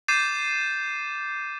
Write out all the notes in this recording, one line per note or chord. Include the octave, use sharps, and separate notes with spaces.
D6 G6 A6 C7 D#7 E7